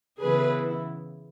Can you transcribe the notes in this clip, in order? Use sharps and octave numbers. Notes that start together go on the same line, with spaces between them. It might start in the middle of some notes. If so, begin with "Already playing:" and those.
C#3 E3 B3 E4 G#4 B4